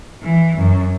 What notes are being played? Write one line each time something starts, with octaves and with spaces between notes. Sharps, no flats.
E3
F#2